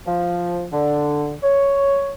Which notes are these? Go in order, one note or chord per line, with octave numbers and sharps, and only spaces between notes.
F3
D3
C#5